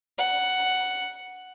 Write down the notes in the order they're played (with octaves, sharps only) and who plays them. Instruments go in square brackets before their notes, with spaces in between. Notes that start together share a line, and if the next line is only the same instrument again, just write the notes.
[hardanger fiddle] F#5